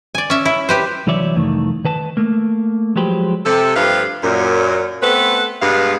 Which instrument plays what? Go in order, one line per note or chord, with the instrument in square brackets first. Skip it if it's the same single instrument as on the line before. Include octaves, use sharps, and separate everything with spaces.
[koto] D5 G#5
C#4 E5
E4
G4 B4 C5
[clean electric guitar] C2 E3 F#3 C#5 D5 E5
C2 F2 D#3 E3 A3
D#3 B4 A5
A3 A#3
F3 F#3 G#3 G4 B4 C5
[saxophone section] C3 A4
G2 F3 A3 G4 B4 F5
F#2 A#2
A3 B3 C4 A4 B4
G2 B2 G#3 B3 B4 F5